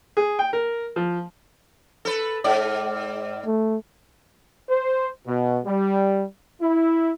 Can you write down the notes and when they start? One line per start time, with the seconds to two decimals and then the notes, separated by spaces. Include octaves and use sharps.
0.17 G#4
0.39 G5
0.53 A#4
0.96 F3
2.05 A4 B4
2.44 G#2 D5
3.46 A3
4.70 C5
5.26 B2
5.65 G3
6.61 E4